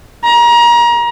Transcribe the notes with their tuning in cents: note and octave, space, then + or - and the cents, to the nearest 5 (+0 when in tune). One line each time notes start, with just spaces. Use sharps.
A#5 +30